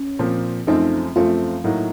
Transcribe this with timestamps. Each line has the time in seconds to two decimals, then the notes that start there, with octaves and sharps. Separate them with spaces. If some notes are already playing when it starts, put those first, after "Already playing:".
Already playing: C#4
0.19 A#2 F3 C4
0.67 F#2 F3 A3 C4 D#4
1.16 F#2 F3 A3 C4 F4
1.64 A2 F#3 A#3 D#4